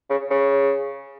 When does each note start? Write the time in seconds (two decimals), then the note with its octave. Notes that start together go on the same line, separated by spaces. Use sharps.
0.10 C#3
0.30 C#3